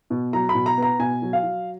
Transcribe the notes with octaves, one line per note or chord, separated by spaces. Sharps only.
B2
F#3 A#5
B5
B2
A#5
B3
A#5
B2 G#5
F#3
F5
F#3